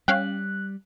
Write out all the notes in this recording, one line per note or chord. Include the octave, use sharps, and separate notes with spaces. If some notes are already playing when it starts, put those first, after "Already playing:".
G3 C#4 F5 G5 F#6